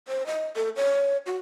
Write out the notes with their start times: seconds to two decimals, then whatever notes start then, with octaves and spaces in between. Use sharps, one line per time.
0.08 C5
0.27 D#5
0.56 A4
0.76 C#5
1.26 F#4